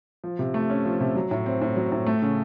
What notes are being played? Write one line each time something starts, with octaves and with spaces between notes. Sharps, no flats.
F3
C3
A3
C#4
F3
C3
F#3
A2
C4
A2
F#3
A2
A3
C#3